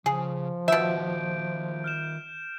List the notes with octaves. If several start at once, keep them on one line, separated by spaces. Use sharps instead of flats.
C#3 F3 G#4
B2 D#3 F4 E5 G6 D7
F6 G6 E7